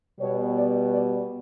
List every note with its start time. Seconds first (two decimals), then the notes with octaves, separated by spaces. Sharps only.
0.20 B2 G3 B3 C#5
0.54 D5
0.89 D5